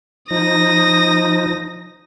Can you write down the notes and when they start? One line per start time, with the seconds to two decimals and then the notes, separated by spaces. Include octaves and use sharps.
0.31 F3 D#4 D#6 A#6